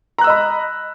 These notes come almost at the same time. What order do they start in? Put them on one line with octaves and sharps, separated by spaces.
A#5 F#6 E6 D#5 B5